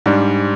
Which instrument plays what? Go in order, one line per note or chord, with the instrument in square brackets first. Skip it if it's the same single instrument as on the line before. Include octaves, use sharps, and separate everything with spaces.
[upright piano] G#2 G3 D4